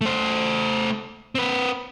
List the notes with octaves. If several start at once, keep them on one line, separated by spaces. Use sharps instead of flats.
A3 C5
C4 B4